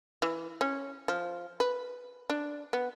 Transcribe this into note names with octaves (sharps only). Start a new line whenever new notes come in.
E3
C#4
F3
B4
D4
B3